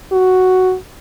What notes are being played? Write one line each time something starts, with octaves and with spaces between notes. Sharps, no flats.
F#4